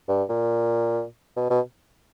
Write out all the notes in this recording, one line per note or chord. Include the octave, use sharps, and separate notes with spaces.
G2
A#2
B2
B2